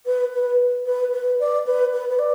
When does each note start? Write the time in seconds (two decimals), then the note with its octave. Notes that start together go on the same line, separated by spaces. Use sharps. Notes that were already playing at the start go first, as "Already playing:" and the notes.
0.06 B4
0.33 B4
0.86 B4
1.13 B4
1.39 D5
1.66 B4
1.93 B4
2.09 B4
2.19 D5